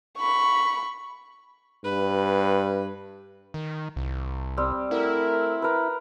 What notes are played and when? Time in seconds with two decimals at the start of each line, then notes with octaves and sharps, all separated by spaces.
0.18 B5 C#6
1.84 G2 B4
3.54 D#3
3.96 C2
4.57 G3 C4 G4
4.91 A3 E4 A#4 F#5
5.62 A#4 B4